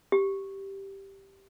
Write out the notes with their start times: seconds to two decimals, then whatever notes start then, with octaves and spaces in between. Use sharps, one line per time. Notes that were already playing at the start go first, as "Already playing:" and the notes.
0.12 G4